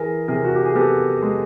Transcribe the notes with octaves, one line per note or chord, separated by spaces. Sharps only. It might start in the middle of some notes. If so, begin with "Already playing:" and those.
Already playing: E3 G#4 A#4
C3 G#4 A#4
F#4
G4
G#4
B3 G4 A4
G#3